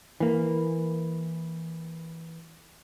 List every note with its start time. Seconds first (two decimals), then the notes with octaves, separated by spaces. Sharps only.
0.20 E3 A#3